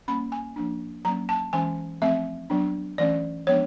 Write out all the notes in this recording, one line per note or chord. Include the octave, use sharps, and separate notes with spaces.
G3 A#3 C#4 B5
G#5
F3 A#3 D4
F#3 A#3 C#4 A#5
A5
E3 G#3 C#4 G#5
F3 A3 C4 E5
F#3 B3 D4
E3 A3 C#4 D5
F3 G#3 B3 D4 C#5